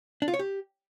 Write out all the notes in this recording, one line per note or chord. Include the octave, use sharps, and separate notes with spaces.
D4
F4
C#5
G4